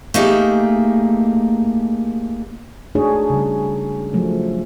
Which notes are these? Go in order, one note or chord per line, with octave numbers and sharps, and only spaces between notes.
A3 A#3 D#4 G4 G#4
A3 D4 D#4 F#4 G#4 C#5
C#3 G3
F3 F#3 A3